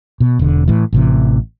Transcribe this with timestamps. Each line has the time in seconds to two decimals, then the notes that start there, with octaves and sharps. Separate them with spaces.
0.20 B2
0.39 E1 D3
0.68 A2 E3
0.93 A1 C3 E3